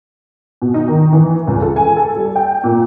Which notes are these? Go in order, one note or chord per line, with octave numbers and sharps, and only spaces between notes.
B2
D#4
D#3
E3
C#2
A4
G#5
A4
G3
G5
A#2